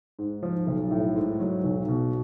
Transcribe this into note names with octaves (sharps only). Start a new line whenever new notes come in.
G#2
F3
B1
A2
G#2
F#3
B1
B2